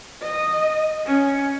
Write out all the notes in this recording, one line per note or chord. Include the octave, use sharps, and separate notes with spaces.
D#5
C#4